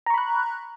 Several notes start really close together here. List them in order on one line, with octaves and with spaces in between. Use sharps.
A#5 C#6 B5 F#6